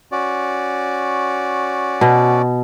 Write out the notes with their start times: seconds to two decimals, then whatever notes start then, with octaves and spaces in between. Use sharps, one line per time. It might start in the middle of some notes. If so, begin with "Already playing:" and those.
0.12 C#4 F#4 D5
2.01 B2